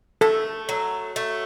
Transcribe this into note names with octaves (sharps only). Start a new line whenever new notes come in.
A3 A4
F#3
A3